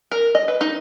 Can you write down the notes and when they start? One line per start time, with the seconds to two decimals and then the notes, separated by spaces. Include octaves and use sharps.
0.11 A#4
0.35 D#5
0.48 B4
0.61 D#4